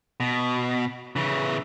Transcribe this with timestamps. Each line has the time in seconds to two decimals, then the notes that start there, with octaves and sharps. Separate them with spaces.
0.20 B2
1.16 C#3 E3